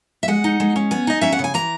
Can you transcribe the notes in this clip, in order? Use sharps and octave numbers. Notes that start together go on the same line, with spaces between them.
E5
G#3 F#5
D#4
G#3
C#4
B3 G#5
D#4 D#5
C#4 E5
F#5
C#3 G#5
E3 A#5